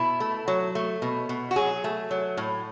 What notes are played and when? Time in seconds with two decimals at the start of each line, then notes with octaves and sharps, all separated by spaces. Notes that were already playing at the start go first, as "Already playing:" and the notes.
Already playing: B2 E4
0.20 A3
0.48 F#3
0.75 A3
1.02 B2
1.29 B2
1.51 F#4
1.56 F#3 G#4
1.84 A3
2.11 F#3
2.37 A2